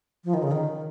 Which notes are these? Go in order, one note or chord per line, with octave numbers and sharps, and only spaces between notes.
F3
D#3
C#3
D#3